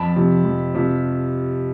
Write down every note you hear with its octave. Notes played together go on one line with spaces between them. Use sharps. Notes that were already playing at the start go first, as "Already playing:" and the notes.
Already playing: F2 A5 B5
C3 F3
F2
C3 F3